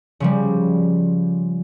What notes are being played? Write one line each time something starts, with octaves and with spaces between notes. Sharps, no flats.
C#3 F3 G3